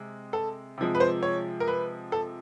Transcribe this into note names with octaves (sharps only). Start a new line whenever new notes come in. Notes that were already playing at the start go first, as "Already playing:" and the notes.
Already playing: C3 G#3
A4
C3 F3 G#3
B4
C5
C#5
A#4
B4
A4